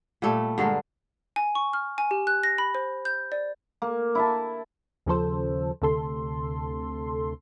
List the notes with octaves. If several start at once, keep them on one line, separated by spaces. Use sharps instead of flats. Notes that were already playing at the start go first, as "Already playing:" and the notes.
A#2 G3 A3
G2 D3 G#3 A#4
G#5
C#6
F6
G#5
G4
F#6
A#6
B5
C5
G6
D5
A#3
E4 E5 A5
D#2 C#3 F3 A4 C5
D2 C3 A4 C6